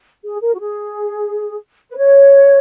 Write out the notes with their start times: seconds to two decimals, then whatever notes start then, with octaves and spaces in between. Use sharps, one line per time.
0.25 G#4
0.42 A#4
0.54 F#4
0.60 G#4
1.90 B4
1.97 C#5